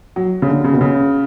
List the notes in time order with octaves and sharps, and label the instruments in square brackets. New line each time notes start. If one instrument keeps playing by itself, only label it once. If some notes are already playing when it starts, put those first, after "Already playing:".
[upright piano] F#3
C#3
D3
C#3
B2
C#3